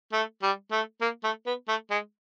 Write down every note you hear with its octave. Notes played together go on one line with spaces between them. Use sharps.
A3
G3
A3
A#3
A3
B3
A3
G#3